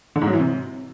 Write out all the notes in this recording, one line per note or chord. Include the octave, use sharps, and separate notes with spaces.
D3
G#2
F#3
E3
C3